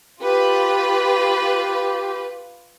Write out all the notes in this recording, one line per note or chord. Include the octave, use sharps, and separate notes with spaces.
F4 G4 B4